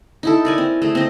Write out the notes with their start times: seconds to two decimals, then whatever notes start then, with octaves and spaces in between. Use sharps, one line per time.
0.23 D#4 E4 A4
0.45 A#4 D5 G#5
0.58 C4
0.82 A3 G#4
0.95 C4 D#5